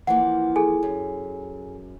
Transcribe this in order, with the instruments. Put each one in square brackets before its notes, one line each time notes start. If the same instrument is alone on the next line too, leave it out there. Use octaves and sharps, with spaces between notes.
[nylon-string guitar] E3 F3 A#3 [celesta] F#5
[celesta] G#4 A4 G#5
[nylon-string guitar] F#2